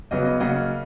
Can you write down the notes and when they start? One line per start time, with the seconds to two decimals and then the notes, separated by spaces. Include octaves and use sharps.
0.11 E2 C#3 F#3 B3 D#5
0.25 D#5
0.40 C#3 F#3 A#3 D#5 F#5